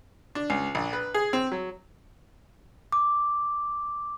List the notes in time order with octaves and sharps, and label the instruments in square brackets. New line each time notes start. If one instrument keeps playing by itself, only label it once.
[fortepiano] D4
C#2
A#1
B4
G#4
C4
F#3
[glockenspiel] D6